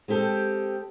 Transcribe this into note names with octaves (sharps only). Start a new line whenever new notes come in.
G#3 C4 G4 A4